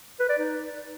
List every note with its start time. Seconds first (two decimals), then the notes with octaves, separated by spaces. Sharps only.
0.20 B4
0.29 D5
0.39 D#4